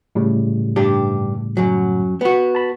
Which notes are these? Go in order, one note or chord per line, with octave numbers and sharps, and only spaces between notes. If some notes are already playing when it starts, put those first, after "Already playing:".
A2 C#3 G3
G2 D4 G4
F#2 F#3
B3 F#4
A5 B5